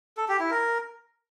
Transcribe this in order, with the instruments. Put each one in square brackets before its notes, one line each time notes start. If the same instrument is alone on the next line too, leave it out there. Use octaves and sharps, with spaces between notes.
[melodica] A4
G4
E4
A#4